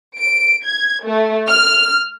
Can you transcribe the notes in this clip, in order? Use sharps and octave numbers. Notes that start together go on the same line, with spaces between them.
D7
G#6
A3
F6